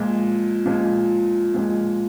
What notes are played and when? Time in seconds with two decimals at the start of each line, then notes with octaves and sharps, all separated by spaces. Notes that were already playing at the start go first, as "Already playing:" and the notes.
Already playing: A#2 F3 G#3
0.66 A#2 F3 G#3
1.54 A#2 F3 G#3